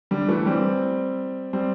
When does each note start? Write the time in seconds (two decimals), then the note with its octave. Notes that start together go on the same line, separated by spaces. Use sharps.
0.11 D3 G3
0.28 E3 A3
0.46 G3 C4
1.53 G3 C4